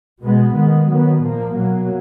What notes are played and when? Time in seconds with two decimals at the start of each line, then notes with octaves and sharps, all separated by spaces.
0.20 B2 G#3 B3
0.54 D#3 G#3 B3
0.87 D#3 F#3 B3
1.21 A#2 F3 A#3
1.55 B2 F#3 A#3